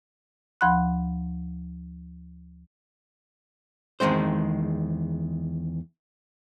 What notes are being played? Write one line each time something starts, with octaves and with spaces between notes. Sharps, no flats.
D2 F3 F#5 B5 C6 F#6
E2 D#3 G#3 C4 C5